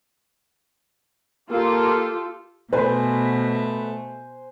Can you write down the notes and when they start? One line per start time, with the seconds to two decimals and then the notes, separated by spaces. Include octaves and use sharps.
1.51 A#3 F4 G4 A4
2.73 B2 A3 B4 C5 G#5